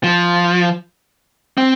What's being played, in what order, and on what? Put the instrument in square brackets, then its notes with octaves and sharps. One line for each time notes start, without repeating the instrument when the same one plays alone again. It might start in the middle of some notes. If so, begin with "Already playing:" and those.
[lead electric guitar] F3
C4